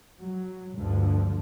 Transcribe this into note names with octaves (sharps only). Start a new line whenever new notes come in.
F#3
D2 G2 D3 F3